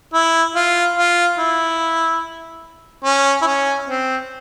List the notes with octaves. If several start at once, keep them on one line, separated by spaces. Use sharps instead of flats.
E4
F4
F4
E4
C#4
E4
C#4
C4